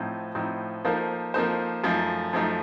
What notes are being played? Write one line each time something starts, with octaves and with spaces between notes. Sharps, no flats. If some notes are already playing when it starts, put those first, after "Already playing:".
Already playing: A2 F3 C4 D#4
A2 F3 C4 D#4
F3 A#3 D#4 A4 C5
F3 A#3 D#4 A4 C5
F#2 F3 A3 D#4
F#2 F3 A3 D#4